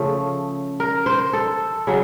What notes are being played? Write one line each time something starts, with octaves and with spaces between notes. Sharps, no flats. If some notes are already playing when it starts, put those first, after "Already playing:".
Already playing: C#3 F3 A3
A#4
C5
A4
C#3 F#3